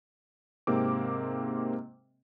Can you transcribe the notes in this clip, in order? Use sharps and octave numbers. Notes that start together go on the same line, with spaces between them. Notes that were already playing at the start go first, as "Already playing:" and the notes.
G#2 C3 A#3 C4 D6